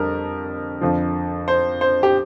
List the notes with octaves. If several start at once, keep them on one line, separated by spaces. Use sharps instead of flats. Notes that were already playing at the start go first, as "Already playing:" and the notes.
Already playing: F2 D3 G3 A#4
F2 D3 F3
C5
C5
G4